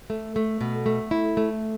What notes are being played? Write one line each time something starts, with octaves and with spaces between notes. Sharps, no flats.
A3
A3
B2
A3
E4
A3